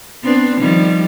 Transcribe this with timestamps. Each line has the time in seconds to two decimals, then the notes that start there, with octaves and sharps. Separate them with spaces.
0.23 B3 C4 D4
0.60 D#3 F3 G3